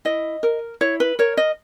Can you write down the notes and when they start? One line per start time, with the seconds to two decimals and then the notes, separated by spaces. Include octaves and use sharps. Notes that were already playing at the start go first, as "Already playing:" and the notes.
0.05 E4 D#5
0.43 A#4
0.81 E4 C#5
1.00 B4
1.19 A#4 C#5
1.37 D#5